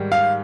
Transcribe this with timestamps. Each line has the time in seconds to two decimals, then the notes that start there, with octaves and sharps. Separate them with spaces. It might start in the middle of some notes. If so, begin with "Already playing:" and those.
Already playing: G#2 D#3 G3
0.12 F5